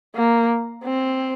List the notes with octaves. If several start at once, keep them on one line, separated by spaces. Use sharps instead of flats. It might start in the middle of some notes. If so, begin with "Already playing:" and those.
A#3
C4